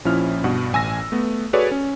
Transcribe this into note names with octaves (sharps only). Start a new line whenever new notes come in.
A#1 F3 C#4 E4 F6
G2 B2 F#5
A1 G#5 E6 A#6
A3 B3
F#4 G#4 A4 B4 C#5 D5
C#4